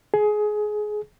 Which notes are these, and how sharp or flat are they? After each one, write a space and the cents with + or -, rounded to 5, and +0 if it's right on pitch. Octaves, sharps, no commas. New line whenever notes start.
G#4 +20